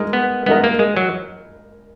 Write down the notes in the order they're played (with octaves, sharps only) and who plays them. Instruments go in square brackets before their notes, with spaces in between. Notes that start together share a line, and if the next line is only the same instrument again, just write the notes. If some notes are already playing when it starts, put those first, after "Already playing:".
Already playing: [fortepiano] G#3 D#4 A#4
[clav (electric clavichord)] B3
[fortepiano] G#3 D#4 A#4 D#5 [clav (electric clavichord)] B3
[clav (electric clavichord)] A#3
G#3
F#3